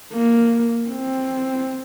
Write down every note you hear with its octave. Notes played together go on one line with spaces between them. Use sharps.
A#3
C4